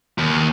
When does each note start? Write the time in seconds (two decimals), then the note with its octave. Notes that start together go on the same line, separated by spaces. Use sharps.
0.18 D#2